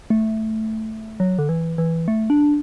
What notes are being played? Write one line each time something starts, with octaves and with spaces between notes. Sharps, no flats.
A3
F#3
D3
E3
E3
A3
D4